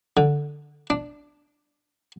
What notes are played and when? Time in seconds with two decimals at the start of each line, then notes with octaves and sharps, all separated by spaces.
0.17 D3
0.90 D4